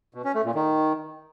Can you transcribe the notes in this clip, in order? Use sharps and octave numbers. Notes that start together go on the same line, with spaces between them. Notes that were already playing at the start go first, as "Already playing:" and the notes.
B2
C#4
A3
A#2
D#3